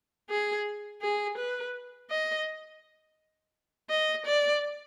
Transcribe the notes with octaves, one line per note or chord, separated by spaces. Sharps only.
G#4
G#4
B4
D#5
D#5
D5